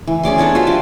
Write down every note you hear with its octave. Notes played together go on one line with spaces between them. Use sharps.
E3
C#4 G#4 D5 C6
B3 D4 A4 C#5
F4 F#4 C5 E5
F3 G4 D5